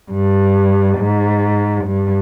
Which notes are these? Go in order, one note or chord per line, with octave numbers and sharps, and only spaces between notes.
G2
G#2
G2